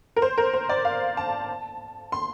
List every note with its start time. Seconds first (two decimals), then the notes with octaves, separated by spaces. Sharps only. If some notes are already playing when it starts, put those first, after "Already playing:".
0.16 A#4
0.22 C5
0.38 A#4
0.53 C5
0.69 D5
0.85 F5
1.17 A5
2.12 C6